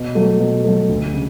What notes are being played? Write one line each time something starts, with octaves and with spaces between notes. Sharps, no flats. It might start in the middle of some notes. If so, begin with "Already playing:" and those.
Already playing: B2
F#3 A3
B2
F#3 A3
D2
C#3